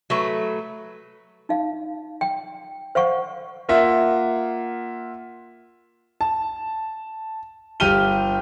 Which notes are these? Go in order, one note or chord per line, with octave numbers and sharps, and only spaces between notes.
F#3 A3 B4
D#4 F5
G5
C5 F5 F#5 C#6
A#3 F4 E5 F#5
A5
G1 G4 F6 D#7 G7